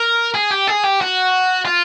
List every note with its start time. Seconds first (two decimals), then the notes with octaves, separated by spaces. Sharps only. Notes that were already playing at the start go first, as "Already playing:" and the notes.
Already playing: A#4
0.35 G#4
0.51 G4
0.68 G#4
0.84 G4
1.01 F#4
1.65 F4